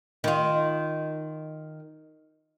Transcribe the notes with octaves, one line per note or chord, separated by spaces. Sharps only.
D#3 F4